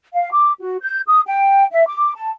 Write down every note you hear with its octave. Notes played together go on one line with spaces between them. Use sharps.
F5
D6
F#4
G6
D#6
G5
E5
D6
A5